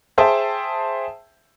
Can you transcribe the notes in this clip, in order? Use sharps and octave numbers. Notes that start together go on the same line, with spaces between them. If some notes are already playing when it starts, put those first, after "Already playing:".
G#4 C5 E5 G5 A5